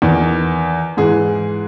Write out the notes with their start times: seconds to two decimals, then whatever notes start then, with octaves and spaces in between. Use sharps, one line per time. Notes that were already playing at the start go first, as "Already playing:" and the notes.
0.02 E2 D#3
0.97 G#2 E3 G#4